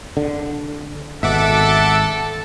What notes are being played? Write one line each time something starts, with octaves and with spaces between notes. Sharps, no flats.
D3
G#1 B2 A4 E5 F#5 D6